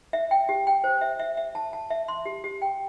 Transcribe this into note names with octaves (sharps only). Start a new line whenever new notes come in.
E5
G5
G4
G5
C5
E5
E5
E5
A5
A5
E5
C6
G4
G4
G5